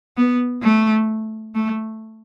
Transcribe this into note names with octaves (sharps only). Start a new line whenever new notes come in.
B3
A3
A3